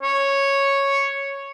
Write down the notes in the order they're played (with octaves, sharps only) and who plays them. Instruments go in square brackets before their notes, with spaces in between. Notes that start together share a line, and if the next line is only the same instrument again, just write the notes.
[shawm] C#5